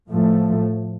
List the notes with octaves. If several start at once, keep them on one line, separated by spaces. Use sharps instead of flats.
A2 F3 A3